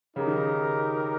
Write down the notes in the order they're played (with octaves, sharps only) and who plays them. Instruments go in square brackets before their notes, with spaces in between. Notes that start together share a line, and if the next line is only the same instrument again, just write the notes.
[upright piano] C#3 [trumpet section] D#4 G4 A#4
[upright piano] D#3
C#3